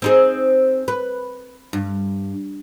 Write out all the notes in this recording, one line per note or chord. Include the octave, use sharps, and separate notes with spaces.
C4 D#4 G#4
B4
G2